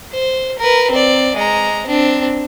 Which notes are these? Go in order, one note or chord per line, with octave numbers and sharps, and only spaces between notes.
C5
A#4 B4
C4 D5
G#3 A#5
C4 D4